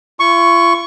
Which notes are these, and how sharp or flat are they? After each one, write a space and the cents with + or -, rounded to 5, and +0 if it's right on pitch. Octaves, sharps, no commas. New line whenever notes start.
F4 -45 C#6 +0